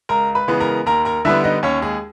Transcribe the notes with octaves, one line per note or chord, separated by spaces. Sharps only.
C#2 A#4 A#5
B4 B5
C#3 E3 G#3 B3
A#4 A#5
D#2 A#4 A#5
A#4 A#5
D3 G3 B3 E4 E5
D#4 D#5
D#2 C#4 C#5
G#3 G#4